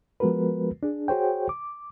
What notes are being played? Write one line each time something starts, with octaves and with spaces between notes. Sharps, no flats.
F3 G#3 B3 F#4 A#4 B4
D4 G#4
F#4 G#4 C5 C#5 G5
D6